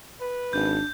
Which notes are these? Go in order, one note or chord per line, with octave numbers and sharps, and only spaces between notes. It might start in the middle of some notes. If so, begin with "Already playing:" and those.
B4
G#1 D4 G6